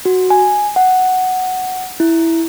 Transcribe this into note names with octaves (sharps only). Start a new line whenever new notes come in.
F#4
G#5
F#5
E4